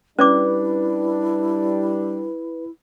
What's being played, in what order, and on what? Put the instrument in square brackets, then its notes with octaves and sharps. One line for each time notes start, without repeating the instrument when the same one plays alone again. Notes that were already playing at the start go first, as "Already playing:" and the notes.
[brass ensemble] G3 D4 [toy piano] C#4 D5 D6 [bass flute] E4 [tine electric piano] B4